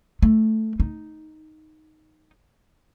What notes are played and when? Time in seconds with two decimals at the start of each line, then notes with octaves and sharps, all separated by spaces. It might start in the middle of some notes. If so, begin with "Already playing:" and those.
0.22 A3
0.80 D#4